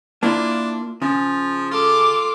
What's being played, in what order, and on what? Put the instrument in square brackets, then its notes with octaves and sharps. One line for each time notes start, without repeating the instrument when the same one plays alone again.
[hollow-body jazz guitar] A#3 E4 F4 [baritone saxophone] D4
[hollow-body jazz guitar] C#3 [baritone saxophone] F3
[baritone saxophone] F4 [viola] A4 D6